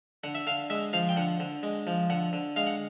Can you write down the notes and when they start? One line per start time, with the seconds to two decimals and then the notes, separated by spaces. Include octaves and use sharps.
0.24 D3 F#5
0.35 E5
0.47 D3 F5
0.70 G#3 E5
0.93 F3 F5
1.09 G5
1.17 D3 F#5
1.40 D3
1.63 G#3
1.87 F3
2.10 D3 F#5
2.33 D3
2.56 G#3 F5
2.67 F#5